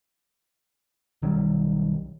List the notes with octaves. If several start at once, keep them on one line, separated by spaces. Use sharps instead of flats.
B1 D#3 F#3 G3